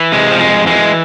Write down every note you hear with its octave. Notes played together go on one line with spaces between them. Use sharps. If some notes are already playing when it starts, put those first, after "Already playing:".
Already playing: E3
C3 G#3
F3
F2 G#3
E3 G#3